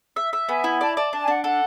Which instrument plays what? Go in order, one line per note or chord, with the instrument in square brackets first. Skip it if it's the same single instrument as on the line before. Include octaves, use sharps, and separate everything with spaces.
[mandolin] E5
E5
[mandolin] B3 [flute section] G#5
[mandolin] E4
[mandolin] D5 [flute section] A5
[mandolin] D5 [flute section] A5
[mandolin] D4 [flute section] A5
[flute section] G#5
[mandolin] D4 [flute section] F#5
[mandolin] A4 [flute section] F#5